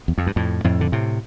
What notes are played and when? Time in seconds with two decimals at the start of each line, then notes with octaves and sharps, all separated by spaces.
0.08 E2
0.18 F2
0.27 G2
0.36 F2 A2
0.64 F2 A2
0.81 D3
0.92 A2 C3